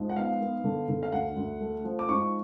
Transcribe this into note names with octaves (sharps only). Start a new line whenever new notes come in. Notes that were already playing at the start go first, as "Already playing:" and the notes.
Already playing: G#2 F3
F#5
B3 F5
B3
D3
D3
F5
D2 F#5
D2
A3
F3
D6
G#2 C#6